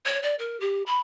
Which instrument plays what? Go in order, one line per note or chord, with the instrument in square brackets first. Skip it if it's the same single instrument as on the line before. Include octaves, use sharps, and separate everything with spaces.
[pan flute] C#5
D5
A#4
G4
B5